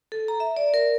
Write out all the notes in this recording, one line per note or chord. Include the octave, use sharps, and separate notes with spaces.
A4
A#5
E5
D5
A#4